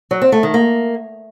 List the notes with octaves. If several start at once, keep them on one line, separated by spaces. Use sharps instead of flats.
F#3
C4
A3
D#3
A#3